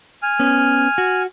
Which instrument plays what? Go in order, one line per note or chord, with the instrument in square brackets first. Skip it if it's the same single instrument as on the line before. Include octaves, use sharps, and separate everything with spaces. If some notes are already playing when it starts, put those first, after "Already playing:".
[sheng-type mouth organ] G#5 F6
[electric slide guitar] B3 C#4
F#4